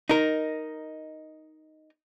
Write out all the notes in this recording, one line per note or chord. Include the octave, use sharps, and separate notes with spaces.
D#4 A#4